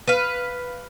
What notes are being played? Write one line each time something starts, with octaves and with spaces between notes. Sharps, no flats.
B4 F5